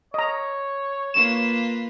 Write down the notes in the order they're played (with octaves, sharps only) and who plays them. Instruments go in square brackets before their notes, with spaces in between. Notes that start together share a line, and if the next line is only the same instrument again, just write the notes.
[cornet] C#5 [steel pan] D#5 A#5
[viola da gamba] A#3 F4 B4 [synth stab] E7